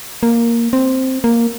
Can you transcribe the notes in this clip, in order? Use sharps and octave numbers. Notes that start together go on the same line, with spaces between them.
A#3
C4
A#3